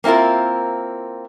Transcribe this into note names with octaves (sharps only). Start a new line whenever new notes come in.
A#3 C4 E4 F4 A#4